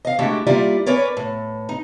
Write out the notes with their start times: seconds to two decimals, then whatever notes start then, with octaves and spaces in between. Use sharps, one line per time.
0.05 D#5 F5
0.19 G#3 A3 D4 E4 F#4 G4
0.47 G3 A#3 E4 F4 D5
0.86 C#4 A#4 B4 C#5 D5
1.17 A2
1.69 D#4